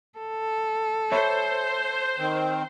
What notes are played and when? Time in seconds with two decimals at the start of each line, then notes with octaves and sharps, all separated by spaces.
0.18 A4
1.12 C5 C#5 E5 B5
2.19 D#3 C4